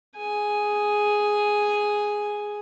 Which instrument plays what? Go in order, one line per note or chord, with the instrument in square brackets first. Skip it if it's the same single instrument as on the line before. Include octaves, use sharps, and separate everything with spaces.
[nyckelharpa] G#4 G#5